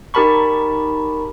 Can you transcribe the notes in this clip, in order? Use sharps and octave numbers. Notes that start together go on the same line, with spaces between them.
D#4 G4 A#4 A5 B5 C#6